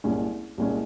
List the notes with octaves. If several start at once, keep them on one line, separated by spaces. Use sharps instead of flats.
C2 A#2 G#3 C#4
C2 A#2 G#3 C#4